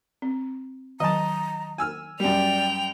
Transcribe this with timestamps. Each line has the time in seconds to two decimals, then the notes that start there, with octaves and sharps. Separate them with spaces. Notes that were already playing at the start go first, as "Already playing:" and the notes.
0.22 C4
1.00 D#3 F#3 D#5 A5 A#5
1.78 G#5 E6 F6
2.20 F#2 G3 D5 G5 F7